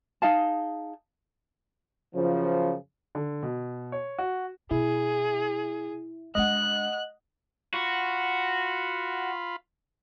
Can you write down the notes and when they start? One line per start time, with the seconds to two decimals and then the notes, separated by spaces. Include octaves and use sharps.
0.22 D#4 G#4 F5 A5
2.15 F#2 C#3 F3
3.15 D3
3.43 B2
3.92 C#5
4.18 F#4
4.71 B2 E4 G#4
6.35 G#3 D4 D#5 F#5 F#6
7.74 F4 F#4 B5